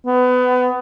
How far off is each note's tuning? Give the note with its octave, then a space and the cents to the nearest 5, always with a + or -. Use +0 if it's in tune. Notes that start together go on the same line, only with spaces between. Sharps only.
B3 +25